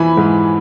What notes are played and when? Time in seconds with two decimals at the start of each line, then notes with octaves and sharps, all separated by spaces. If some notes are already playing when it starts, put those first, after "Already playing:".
Already playing: F2 E3 G#5 B5
0.17 G#2